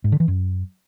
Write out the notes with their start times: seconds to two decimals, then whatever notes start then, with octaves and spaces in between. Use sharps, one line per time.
0.04 G#2
0.12 D3
0.20 E3
0.28 F#2